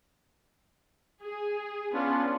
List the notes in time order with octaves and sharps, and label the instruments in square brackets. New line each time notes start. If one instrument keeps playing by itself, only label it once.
[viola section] G#4
[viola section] B3 [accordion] C#4 D4 F4